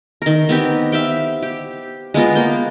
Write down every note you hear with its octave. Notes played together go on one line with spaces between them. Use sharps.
D#3 A#4
B3 C4 G4
E5 F5 G5
G4
G#3 B3 F4 A#4
A#3 G5